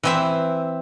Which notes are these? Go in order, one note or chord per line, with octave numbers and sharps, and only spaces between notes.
E3 C4 E5